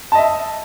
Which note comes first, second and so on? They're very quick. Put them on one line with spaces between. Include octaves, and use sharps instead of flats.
A5 D#5 E5